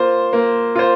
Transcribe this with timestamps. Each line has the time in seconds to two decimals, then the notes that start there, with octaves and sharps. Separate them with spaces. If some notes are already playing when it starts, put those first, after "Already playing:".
Already playing: A#3 F4 C5
0.33 A#3
0.76 F4 C5